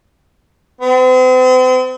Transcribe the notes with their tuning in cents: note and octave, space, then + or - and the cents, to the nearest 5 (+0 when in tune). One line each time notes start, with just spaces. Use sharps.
C4 -40